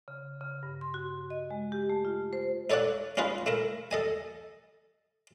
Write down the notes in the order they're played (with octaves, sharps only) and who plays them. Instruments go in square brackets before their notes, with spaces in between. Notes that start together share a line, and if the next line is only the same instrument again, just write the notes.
[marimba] C#3
C#3
G2
C6
F#4
D#5
G#3
G4
A3
F4
C5
[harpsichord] D#4 A4 C#5 D5 F#5
C#4 D#4 F4 G#4 B4
A3 E4 A#4
A4 D#5 G#5